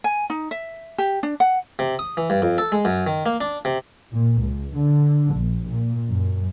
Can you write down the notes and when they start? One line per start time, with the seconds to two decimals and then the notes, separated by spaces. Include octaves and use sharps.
0.04 G#5
0.30 D#4
0.51 E5
0.98 G4
1.23 D4
1.40 F#5
1.79 C3
1.99 D#6
2.17 E3
2.30 G2
2.42 F2
2.58 A4
2.72 G#3
2.85 F#2
3.07 D#3
3.26 A#3
3.41 D4
3.65 C3
4.12 A#2
4.42 C#2
4.76 D3
5.34 A#1
5.67 A#2
6.09 F#2